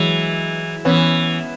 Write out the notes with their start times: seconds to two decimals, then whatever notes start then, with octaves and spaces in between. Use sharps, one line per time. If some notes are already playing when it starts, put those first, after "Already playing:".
Already playing: E3 F#3 G#3
0.85 E3 B3 C#4